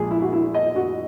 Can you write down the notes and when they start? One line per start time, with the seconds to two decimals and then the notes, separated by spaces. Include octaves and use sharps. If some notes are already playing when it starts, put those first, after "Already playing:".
Already playing: A#1 A#2 G#3 G#4
0.11 E4
0.22 F#4
0.33 E4
0.54 D#5
0.76 F#4